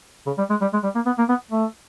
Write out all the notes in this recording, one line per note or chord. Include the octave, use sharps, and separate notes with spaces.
C#3
G3
G#3
G3
G#3
G3
A#3
B3
A#3
B3
A3